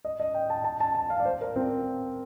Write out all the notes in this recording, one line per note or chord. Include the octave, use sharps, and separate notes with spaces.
D#5
D#5
G5
A5
A5
A5
A5
F5
D5
C5
A#4
C4